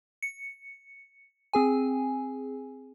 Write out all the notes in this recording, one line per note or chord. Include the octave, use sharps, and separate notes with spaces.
C#7
C4 G#4 G#5